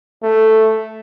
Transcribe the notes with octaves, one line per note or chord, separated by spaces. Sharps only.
A3